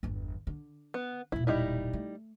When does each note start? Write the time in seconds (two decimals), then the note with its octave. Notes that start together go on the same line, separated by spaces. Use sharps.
0.03 G1 E2
0.47 D3
0.94 B3
1.32 E1 A#2 E4
1.47 G3 D#4 E4
1.93 A3